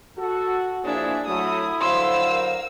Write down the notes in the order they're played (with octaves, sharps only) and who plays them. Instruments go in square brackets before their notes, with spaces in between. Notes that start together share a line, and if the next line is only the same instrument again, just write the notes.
[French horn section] F#4 [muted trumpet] A4
[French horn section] F3 A#3 E4 [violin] D4 E5 [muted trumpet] G#4
[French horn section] F#3 A3 [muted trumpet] E4 [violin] D#6
[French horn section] D3 F#3 C5 [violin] F5 E6 [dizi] C6
[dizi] A#4